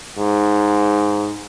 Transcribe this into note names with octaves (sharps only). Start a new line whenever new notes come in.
G#2